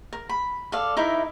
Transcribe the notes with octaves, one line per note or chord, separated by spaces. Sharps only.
A#4
B5
A4 D5 F5
D#4 E4 A#4 E5